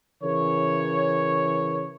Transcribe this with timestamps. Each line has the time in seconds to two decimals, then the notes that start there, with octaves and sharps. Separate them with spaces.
0.23 C#3 E3 A#4 C#5